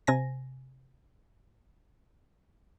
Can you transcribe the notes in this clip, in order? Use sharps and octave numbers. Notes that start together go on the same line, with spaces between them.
C3 G#5 A#6